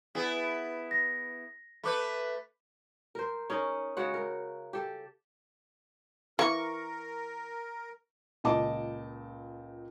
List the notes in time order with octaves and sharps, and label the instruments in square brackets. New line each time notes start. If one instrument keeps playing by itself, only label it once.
[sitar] B3 E4 G#4 [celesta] D5
[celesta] A#6
[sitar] A3 B4 [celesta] B5 D6 G6
[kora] A#4 C5
C#4 D#4 G#4 A#4
C#3 G#3 F#4 F#5
A#4
G4 A4
[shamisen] E3 [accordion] A#4 [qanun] C#6
[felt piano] C#2 A#2 D#5 A5 D6